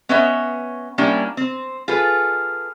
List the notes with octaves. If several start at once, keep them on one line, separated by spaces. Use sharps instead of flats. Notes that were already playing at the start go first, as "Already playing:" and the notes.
B3 C#4 B4 C#5 D#5 E5
G3 A#3 C#4 D4 E4
C4
F4 G#4 A4 B4